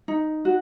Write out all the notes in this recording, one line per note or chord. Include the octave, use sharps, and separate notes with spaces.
D#4
F#4